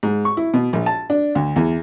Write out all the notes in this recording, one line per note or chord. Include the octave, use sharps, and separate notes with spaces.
G#2
C#6
E4
B2
A#1
A5
D4
D2
E2